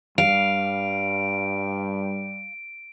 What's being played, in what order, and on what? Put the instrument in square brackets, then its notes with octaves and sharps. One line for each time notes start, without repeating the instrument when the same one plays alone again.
[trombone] G2 [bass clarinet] G3 [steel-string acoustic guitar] F5 [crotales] D7